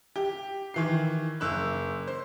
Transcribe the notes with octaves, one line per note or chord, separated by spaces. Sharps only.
G4
D#3 E3 C7
F#1 E6 F#6
C5